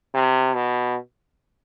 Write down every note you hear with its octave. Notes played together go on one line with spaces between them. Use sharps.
C3
B2